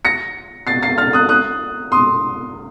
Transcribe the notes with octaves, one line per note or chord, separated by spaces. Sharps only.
A#6 C#7
A6 C7
A6 C7
F6 A6
D#6 F#6
D#6 F#6
C6 D#6